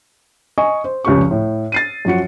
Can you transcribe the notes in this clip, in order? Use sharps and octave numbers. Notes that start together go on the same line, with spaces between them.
D#5 G#5 C#6
C5
F1 C#2 C#3 G4 C#6
A2
A6 C7 D#7
F#2 F3 F#4 C#7